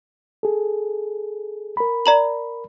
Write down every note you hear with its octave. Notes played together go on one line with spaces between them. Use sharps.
G#4 A4
A#4 B5
D5 A#5 F#7